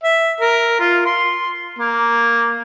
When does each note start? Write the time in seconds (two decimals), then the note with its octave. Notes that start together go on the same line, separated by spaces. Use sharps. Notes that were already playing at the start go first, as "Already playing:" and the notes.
0.03 E5
0.40 A#4
0.80 F4
1.06 C6
1.79 A#3